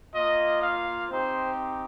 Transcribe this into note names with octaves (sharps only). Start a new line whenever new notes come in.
A#3 F4 D#5
F5
C4 D#4 G4 C5